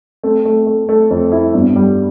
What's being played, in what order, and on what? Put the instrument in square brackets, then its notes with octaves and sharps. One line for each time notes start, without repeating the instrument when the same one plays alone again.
[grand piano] A3 [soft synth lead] C4
[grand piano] A3
A3
[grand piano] A3 [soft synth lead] C4
[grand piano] F2
E4
[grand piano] G2 [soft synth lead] B3
[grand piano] G3